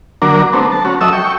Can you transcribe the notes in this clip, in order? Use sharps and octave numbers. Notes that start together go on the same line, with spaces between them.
D3 F#3 A#3 D4 A#4
A3 B3 C4
A5
C#4 F#4
F#3 A4 D#5 E5 E6
G5 C#6